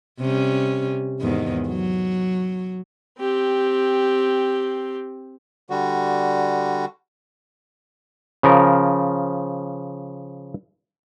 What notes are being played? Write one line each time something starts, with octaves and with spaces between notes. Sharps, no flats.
C3 G3 C#4
E2 G#2 D#3
F#3
C4 G4
D3 G3 F#4
C#3 F3 A#4